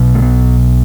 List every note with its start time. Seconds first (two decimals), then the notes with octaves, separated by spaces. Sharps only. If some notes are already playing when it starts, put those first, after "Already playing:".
Already playing: B1 B2
0.15 A3
0.22 B3